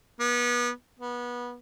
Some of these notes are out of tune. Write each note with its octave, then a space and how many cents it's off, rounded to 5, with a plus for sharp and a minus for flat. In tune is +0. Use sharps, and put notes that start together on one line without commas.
B3 -30
B3 -25